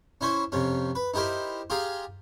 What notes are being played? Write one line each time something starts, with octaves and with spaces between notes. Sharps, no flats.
C#4 E4 C5 C#5
F2 C3 C#4
B4
D#4 E4 G4 A#4 C5
F4 G4 G#4 F5 A#5